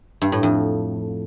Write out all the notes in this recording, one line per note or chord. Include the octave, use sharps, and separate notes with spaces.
G2
A2
F2